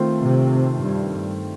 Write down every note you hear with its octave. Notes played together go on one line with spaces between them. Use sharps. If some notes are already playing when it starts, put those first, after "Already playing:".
Already playing: D#3 A3 C4 F4 C5
C3
G2